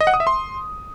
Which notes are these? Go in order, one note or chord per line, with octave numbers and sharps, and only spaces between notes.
D#5
F#5
D#6
E5
C6